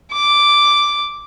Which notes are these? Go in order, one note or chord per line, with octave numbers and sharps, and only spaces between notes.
D6